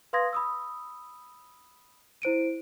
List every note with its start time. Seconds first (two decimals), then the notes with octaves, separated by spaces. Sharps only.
0.13 B4 F5 C6 D#6 G#6 A#6
0.33 B5 D#6 E6
2.22 E4 C5 D7 D#7